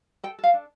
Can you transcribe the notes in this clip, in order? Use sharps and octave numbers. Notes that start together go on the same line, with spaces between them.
A4 G5
A4 F5
D4